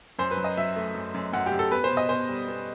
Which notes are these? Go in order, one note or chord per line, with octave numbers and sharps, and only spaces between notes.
F#2 C5
B4
F#3
D#5
F#3 E5
A3
F#2
F#2
F#2 F#5
G4
F#2
A4
B3 B4
C5
B2
D#5
B2 C5
G3
B3